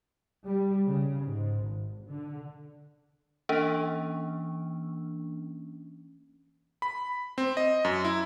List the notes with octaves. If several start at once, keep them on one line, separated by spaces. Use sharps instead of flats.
G3
C#3
G#2
G#1
D3
E3 A#3 C#4 D4
B5
C4
D#5
F#2
E4